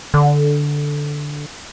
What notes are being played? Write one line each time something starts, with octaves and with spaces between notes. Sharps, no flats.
D3